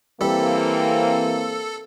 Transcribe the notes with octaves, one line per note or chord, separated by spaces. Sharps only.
E3 G3 A#3 C4 A4